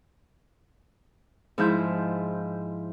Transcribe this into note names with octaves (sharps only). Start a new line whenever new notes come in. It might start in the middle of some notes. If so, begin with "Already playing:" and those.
G#2 F3 E4 G6